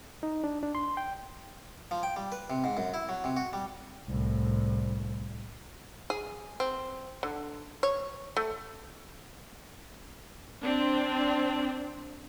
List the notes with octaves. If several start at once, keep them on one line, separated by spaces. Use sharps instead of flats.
D#4
D4
D4
C6
G5
F3
G5
G3
B4
C3
G#2
F#2
E4
F#3
C3
F#4
G3
C2 A2
G#4
C4
D3
C#5
A3
C4 D4